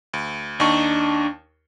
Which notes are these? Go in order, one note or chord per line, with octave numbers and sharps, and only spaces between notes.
D2
D#2 D4 D#4 C#6